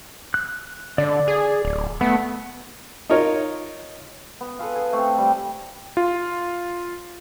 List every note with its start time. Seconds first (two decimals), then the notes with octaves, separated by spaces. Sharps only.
0.34 F#6
0.98 D3 D5
1.28 G#4
1.65 D1
2.01 A3 B3
3.10 D#4 F4 A#4 C#5 D#5
4.41 B3
4.59 F4 G#4 A4 B4
4.75 G#4
4.93 A3 C4 A4
5.18 G3
5.97 F4